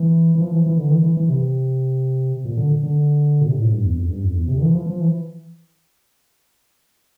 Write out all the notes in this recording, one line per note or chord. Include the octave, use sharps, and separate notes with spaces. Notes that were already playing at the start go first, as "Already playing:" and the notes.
Already playing: E3
E3
F3
E3
E3
D3
E3
E3
E3
C3
A#2
D3
D3
A#2
C3
A#2
A2
G2
E2
F2
G2
F2
E2
C3
D3
E3
F3
F3
E3